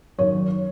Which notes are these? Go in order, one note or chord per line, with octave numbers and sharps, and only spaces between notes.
F#2 D#3 C#5